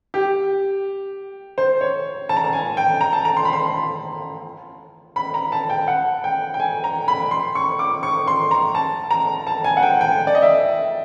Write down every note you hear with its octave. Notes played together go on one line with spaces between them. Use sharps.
G4
C5
C#5
A5
A#5
A5
G#5
G5
A#5
A5
A#5
C6
B5
C6
B5
A#5
A5
G5
F#5
G5
G5
G#5
A#5
B5
C6
C#6
D6
C#6
C6
A#5
A5
A#5
A5
G#5
F#5
G5
G5
D5
D#5
E5